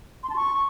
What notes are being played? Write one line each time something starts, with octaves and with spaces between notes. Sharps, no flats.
C6
A5
C#6